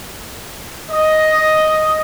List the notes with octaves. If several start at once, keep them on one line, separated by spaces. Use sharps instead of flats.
D#5